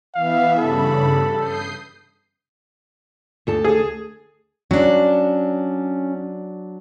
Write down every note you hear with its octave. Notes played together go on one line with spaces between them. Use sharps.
E3 B3 E5 F5
G2 C#3 A4 B5
D#6 G6 C7
D2 A4 A5
G#4
F#3 C#4 D4